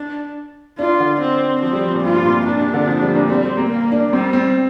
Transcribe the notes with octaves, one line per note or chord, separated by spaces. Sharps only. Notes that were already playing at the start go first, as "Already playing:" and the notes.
Already playing: D4
D4 F4
D3
C4
F3 C4
G3
F3
A#2
G2 F4
C3
A#2
A#2 D4
C3
D3
F3
G3
A#2
G3 C4
G3
A#3
A#3
D4
G3 C4
C4